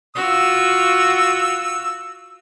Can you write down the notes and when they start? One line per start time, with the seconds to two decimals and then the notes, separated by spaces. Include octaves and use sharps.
0.16 F4 F#4 E6